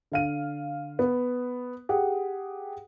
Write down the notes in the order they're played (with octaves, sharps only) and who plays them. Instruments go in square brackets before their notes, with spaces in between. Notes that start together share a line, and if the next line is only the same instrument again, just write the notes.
[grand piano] D3 F5 D#7
B3
G4 G#4 F#5